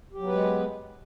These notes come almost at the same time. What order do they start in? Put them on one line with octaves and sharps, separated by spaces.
G4 F#3 B3 B4 G#3